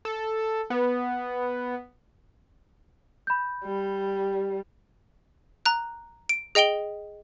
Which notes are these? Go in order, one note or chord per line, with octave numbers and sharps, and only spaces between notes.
A4
B3
B5 G6
G3
A#5 F#6
D7
G#4 D#5 G5 D7 G7